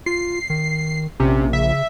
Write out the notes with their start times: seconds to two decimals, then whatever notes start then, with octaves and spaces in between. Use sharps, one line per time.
0.06 F4 C7
0.50 D#3
1.20 A#1 C3 C#4
1.53 C#3 E5